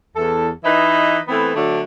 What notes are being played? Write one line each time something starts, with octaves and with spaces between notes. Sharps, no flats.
E2 A4
E3 D#4 B4 D#5 E5
E3 A3 B3 C4
D3 F#3 A3 D4